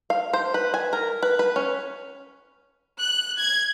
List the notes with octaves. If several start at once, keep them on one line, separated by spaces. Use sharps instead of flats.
F5
C5
B4
G#5
A#4
B4
B4
C#4
F#6
G#6